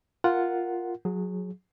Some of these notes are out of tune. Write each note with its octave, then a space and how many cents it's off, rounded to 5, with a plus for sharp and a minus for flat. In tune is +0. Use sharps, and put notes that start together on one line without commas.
F4 +0 A#4 +0 F#5 +0
F#3 -20 G#4 +0